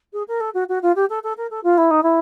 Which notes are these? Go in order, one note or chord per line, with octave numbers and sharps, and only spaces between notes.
G#4
A#4
A4
F#4
F#4
F4
G4
A4
A4
A#4
A4
F4
E4
D#4
E4